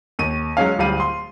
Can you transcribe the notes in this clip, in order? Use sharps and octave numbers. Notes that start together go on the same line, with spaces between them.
D#2 D#7
F#3 G#3 C#4 F5
D1 G3 F5 D#7
C6